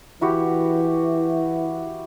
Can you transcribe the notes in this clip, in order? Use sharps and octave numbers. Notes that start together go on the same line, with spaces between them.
E3 E4 F#4 G4